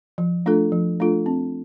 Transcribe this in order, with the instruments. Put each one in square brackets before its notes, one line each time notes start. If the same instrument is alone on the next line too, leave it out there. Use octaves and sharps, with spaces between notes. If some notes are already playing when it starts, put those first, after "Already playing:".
[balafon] F3
A3 D4 F4 A4
F3
A3 D4 F4 A4
C4